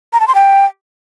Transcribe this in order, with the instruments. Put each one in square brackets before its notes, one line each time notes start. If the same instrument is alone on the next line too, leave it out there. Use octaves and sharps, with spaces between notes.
[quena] A#5
A5
C6
G5